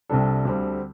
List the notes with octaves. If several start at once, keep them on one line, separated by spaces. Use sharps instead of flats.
C2 C3 G3 D4 A4
D2 D3 G3 C4